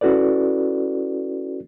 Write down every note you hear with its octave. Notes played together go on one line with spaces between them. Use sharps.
C#4 E4 F#4 A4 B4 D5